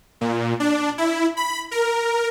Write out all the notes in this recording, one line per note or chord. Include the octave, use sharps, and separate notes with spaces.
A#2
D4
E4
B5
A#4